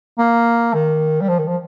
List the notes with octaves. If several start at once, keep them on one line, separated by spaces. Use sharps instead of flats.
A#3
D#3
G3
F3
D#3
F3